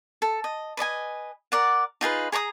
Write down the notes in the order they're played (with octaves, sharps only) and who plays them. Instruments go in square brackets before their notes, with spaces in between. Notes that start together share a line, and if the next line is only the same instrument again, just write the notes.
[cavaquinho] A4
D#5
B4 D5 D#5 G#5
A#4 D5 F#5
D#4 F4 G#4 B4
G#4 A#5 C#6 D#6